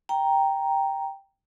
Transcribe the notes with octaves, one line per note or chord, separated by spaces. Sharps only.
G5 A#5